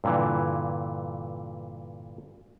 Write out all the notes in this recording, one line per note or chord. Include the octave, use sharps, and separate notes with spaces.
G2 A#2 D3 E3